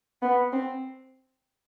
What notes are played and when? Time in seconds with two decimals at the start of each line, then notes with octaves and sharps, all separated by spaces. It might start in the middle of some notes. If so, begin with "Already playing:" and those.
0.22 B3
0.53 C4